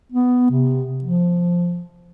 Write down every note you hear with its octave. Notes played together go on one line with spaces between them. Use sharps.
B3
C3
F3